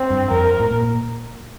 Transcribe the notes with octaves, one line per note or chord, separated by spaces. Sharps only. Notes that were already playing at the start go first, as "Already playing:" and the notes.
Already playing: C4
G2
F2 A#4
A2
A#2